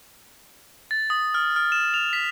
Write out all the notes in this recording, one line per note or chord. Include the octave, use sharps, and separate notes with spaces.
A6
D#6
F6
F6
E7
F7
B6